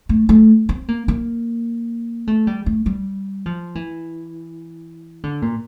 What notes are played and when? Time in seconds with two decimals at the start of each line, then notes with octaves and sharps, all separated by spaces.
0.09 A3
0.29 A3
0.69 C4
0.88 A#3
1.08 A#3
2.27 A3
2.47 G3
2.66 A3
2.86 G3
3.46 F3
3.75 E3
5.24 D3
5.42 A#2